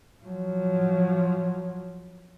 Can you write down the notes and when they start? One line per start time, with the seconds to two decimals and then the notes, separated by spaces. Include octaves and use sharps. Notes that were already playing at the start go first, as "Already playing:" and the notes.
0.24 F3 F#3